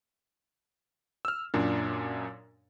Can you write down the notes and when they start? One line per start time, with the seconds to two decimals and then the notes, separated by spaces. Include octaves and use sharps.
1.25 E6 F6
1.54 F#2 A#2 D4